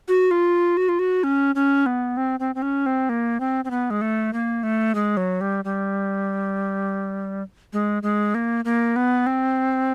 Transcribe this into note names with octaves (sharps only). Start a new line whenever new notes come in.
F#4
F4
F#4
F4
F#4
C#4
C#4
B3
C4
C4
C4
C#4
C4
A#3
C4
C4
B3
G#3
A3
A#3
A3
G#3
F#3
G3
G3
G#3
G#3
A#3
A#3
B3
C4